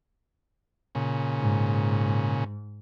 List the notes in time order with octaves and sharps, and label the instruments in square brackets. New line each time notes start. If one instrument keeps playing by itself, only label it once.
[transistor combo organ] A#2 C#3
[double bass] G#2